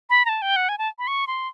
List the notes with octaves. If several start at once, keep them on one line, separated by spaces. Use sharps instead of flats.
B5
A#5
A5
G5
F#5
G#5
A5
B5
C#6
C6